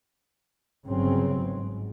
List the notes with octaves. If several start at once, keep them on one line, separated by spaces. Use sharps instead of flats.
G1 C#3 F#3 C4
G#2